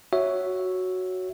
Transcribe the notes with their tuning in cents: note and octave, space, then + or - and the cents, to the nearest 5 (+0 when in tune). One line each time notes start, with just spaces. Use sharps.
F#4 +0 C#5 +0 E5 +0